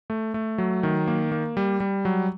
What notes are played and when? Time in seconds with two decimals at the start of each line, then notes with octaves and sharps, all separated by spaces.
0.10 A3
0.34 A3
0.58 F#3
0.83 D#3
1.07 A#3
1.32 A#3
1.57 G3
1.80 G3
2.05 F#3